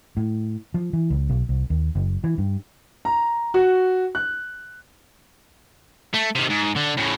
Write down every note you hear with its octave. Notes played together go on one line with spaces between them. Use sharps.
A2
F3
E3
C#2
B1
C2
D#2
F#1
E3
G2
A#5
F#4
F#6
A3
C3 D#3
G#2
D3
A2 C#3